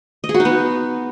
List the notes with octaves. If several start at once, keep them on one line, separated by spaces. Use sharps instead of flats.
D#5
G#4
F#4
D#4
B3